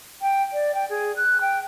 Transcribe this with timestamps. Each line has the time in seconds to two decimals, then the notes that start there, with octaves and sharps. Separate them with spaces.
0.22 G5
0.53 D5
0.75 G5
0.90 G#4
1.16 F#6
1.41 G5